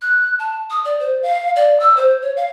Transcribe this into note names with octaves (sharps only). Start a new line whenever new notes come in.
F#6
A5
D#6
D5
C5
F5
D5
E6
C5
C#5
F5